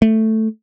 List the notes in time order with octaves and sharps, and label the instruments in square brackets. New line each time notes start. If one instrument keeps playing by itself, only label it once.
[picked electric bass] A3